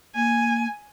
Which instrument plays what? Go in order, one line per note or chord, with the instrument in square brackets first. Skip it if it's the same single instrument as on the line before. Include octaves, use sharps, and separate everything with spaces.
[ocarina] A#3 [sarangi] G#5